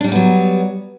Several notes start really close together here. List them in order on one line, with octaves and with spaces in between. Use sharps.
D4 G3 C#4 B3 F#3